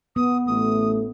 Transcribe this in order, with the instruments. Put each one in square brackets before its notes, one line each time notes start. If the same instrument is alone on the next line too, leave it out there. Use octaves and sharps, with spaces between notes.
[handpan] B3 [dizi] D#6
[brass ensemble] A1 A3 [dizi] D#6